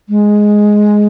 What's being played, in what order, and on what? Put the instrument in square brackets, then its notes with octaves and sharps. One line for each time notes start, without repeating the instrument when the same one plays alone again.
[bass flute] G#3